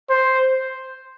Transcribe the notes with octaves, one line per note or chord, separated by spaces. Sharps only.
C5